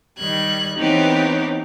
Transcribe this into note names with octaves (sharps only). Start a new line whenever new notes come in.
D#3 G3 F#6 G#6
E3 B3 C4 D#4 G4 C#5